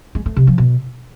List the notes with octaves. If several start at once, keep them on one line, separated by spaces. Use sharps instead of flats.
G#3
A3
C3
F3
B2